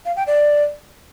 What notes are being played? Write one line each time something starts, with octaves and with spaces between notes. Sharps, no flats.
F5
G5
D5